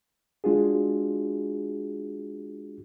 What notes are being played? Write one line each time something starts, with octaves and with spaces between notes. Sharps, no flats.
G#3 D4 F4 F#4 G#4